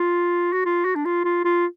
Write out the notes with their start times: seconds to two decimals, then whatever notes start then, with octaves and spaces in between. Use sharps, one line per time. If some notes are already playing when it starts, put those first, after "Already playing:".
Already playing: F4
0.53 F#4
0.66 F4
0.85 F#4
0.96 D4
1.05 F4
1.25 F4
1.45 F4